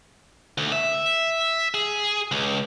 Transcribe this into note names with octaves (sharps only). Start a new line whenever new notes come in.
D2
E5
G#4
C#2